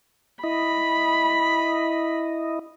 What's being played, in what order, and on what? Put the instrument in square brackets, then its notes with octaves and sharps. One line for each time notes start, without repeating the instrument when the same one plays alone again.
[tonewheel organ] E4 D#5 [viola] B5